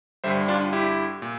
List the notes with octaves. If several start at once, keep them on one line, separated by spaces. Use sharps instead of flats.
G2 D3 G3 C5 E5
D4 F4
E4 G4
A#2